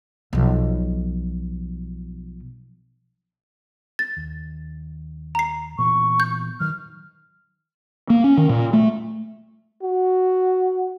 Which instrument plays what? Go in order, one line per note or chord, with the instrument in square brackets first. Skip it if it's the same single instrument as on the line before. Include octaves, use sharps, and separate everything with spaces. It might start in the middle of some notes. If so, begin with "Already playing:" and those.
[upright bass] B1 F3
[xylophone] A6
[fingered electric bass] D#2
[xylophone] A#5 C7
[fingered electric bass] A#2 E3 B3 [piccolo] C#6
[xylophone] G6
[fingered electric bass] D#3 F#3 [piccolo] F6
[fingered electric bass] A#3
C#4
D#3
A#2
A3
[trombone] F#4